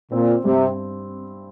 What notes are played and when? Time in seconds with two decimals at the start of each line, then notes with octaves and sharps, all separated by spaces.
0.12 A#2 C4
0.44 G2 C3